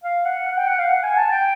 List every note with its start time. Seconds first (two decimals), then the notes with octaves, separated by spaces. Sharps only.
0.04 F5
0.25 F#5
0.47 F#5
0.58 G5
0.68 F#5
0.79 F5
0.89 F#5
1.03 G#5
1.17 A5
1.31 G5